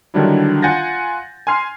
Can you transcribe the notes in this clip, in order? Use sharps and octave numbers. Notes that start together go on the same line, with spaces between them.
D3 D#3 F#3 G3 D4 E4
F4 F#5 G#5 G6 A6 A#6
G#5 C6 F6 C7